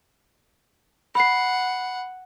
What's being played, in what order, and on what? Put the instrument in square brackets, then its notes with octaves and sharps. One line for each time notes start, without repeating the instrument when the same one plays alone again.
[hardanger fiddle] F#5 [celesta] B5 C7